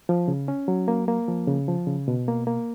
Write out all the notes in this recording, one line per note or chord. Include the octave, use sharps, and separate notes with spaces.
F3
C#3
C#4
F#3
A#3
A#3
F3
C#3
F3
C#3
B2
A#3
A#3